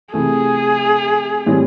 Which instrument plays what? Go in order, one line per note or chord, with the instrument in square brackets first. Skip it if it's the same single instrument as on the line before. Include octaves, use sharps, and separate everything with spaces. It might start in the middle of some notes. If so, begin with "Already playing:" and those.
[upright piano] C3 E3 A3 [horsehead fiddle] G#4
[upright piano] A2 E3 G3 C4